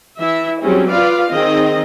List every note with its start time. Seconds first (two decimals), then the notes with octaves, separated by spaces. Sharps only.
0.20 E3 E4 E5
0.61 F#3 G3 C4 C#4 G#4
0.91 F4 B4 D5 F5
1.31 D#3 C4 G#4 D#5